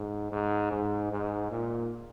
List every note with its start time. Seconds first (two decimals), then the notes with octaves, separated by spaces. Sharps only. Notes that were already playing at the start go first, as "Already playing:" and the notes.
Already playing: G#2
0.32 G#2
0.72 G#2
1.12 G#2
1.51 A#2